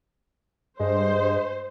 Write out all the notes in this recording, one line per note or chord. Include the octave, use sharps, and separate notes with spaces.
G2 G#3 C5